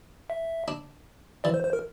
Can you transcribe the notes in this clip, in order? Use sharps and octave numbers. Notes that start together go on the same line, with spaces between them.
E5
D4
E3 D5
C5
C5
A#4